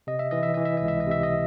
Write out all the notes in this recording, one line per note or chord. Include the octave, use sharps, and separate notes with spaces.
C3 D#5
E5
E3 D#5
E5
E3 D#5
E5
C#2 D#5
E5
D#5
C3 E5
D#5